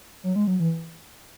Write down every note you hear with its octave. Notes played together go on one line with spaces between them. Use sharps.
F#3
G#3
F#3
E3